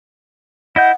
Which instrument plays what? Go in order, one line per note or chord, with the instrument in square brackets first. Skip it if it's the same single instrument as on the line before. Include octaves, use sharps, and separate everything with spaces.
[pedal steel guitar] E4 D#5 G6 [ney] F#5